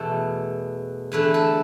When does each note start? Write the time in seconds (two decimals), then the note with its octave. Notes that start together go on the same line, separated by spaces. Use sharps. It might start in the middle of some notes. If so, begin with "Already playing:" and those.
Already playing: E2 B2 A3 A4
1.12 E2 D3 A3 B4
1.34 A4